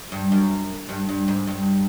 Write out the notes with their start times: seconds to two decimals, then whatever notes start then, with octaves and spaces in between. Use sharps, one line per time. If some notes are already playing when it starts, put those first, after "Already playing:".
0.12 G2
0.32 F#2
0.89 G2
1.09 G2
1.28 G#2
1.47 G2